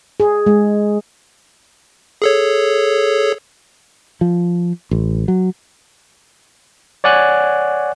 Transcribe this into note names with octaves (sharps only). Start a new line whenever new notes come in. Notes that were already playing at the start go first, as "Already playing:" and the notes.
G#4
G#3
G#4 A4 C#5
F3
A1
F#3
C#5 D5 F#5 G#5 F#6